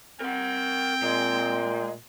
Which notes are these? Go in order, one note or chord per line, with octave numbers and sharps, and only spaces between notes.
C4 A#4 F#5 G5
A#2 G#3